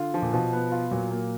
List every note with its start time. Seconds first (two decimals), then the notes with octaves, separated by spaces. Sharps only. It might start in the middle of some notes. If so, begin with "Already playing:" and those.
Already playing: D3 F4
0.14 F3
0.22 A#2
0.33 B2 F3
0.53 B3
0.72 F4
0.91 A#2 F#3
1.10 A#3